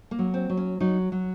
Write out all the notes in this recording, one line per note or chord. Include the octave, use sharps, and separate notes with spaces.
A#3
F#3
C4
F#3
C#4
F#3 D#4
F#3